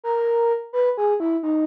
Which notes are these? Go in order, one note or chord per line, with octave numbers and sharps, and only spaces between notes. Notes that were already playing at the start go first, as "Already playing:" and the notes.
A#4
B4
G#4
E4
D#4